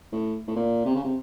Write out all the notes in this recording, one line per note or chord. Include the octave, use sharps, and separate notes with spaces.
A2
A2
A#2
C3
C#3
C3